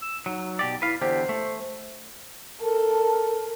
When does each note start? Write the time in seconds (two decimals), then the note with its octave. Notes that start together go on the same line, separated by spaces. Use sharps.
0.02 E6
0.26 F#3 D#4
0.59 B2 G4 D5
0.82 E4 B4 F5
1.02 E2 D3 G4 C5
1.29 A3
2.61 A4 A#4